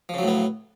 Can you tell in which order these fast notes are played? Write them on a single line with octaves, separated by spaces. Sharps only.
F3 C#3 F#3 A2 B3